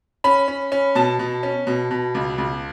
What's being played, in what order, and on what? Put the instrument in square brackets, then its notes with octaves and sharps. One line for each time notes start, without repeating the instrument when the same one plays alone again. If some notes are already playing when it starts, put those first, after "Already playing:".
[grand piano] C#4 B5
C#4
C#4
B2 A5
B2
C#4
B2
B2
C#2
C#2